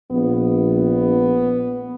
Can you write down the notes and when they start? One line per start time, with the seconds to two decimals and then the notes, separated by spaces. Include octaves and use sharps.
0.11 A#1 B3